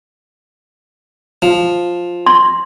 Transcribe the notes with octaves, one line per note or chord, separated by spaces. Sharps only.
F3
C6